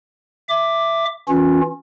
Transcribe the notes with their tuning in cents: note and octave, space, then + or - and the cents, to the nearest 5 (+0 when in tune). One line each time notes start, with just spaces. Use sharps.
E5 +10 D6 +5
E3 +0 C#4 +0 F4 +40